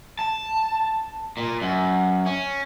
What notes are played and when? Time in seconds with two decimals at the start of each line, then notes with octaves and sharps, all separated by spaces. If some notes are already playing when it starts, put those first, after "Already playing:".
0.19 A5
1.37 A#2
1.62 F#2
2.26 C#4